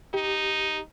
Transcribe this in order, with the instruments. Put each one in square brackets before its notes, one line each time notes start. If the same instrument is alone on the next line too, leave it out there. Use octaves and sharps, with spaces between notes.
[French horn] D#4 [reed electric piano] G4